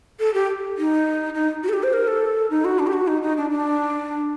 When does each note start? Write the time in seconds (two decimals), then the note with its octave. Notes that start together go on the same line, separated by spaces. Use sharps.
0.20 A4
0.34 G4
0.78 D#4
1.34 D#4
1.63 F#4
1.69 A4
1.73 G4
1.83 C5
1.93 A#4
2.07 A4
2.50 D#4
2.65 F#4
2.79 D4
2.87 G4
2.93 F#4
3.08 D#4
3.22 D#4
3.37 D4
3.50 D4